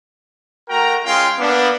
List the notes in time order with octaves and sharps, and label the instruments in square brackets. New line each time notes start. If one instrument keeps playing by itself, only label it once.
[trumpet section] A3 F#4 A#4 G5 A#5
G#3 C#4 F4 F5 G5 C6
A#3 B3 D4